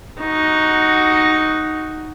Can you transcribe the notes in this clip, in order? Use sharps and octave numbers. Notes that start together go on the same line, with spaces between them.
D#4 F#4